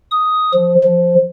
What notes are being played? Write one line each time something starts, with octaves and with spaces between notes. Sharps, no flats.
D#6
F3
F3